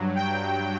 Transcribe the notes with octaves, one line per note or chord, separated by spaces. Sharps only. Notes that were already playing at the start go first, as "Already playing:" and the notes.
Already playing: G2 F#3
G5